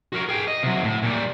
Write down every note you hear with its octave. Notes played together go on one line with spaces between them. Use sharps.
F#4 A#4
G#4 G5
D#5
C3 F#3
A2
A#2 G3